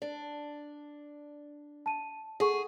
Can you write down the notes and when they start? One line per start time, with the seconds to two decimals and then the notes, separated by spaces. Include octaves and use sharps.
0.02 D4
1.86 A5 D#7
2.40 G#4 A4 F#5 C#6